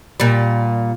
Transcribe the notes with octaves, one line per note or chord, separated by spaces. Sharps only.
A#2 G3